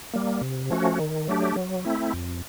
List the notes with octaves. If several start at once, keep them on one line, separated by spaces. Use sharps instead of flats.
G3 A#3
C3
F3 A3 C#4 F#4
D#3
F#3 A3 D4 G4
F#3
A3 C4 E4
F2